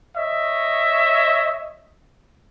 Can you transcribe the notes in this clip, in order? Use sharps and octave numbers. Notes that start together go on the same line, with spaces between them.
C#5 D#5 E5